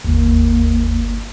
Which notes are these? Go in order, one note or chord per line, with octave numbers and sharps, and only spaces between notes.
G1 D#2 A#3